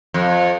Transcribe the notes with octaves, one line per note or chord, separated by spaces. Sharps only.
F2